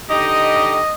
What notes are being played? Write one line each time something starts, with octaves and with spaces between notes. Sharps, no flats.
D3 D#4 G4 D#5